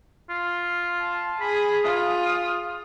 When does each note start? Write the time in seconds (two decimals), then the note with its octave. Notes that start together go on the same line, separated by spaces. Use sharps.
0.30 F4
1.01 A5
1.41 G#4 B5
1.84 F4 D#6